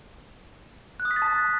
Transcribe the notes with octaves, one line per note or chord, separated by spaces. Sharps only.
F#6
D#6
B6
A6
A5